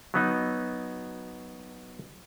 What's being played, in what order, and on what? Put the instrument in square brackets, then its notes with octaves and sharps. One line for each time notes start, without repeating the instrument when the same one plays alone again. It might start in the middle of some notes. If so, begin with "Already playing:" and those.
[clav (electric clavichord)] F#3 B3 D#4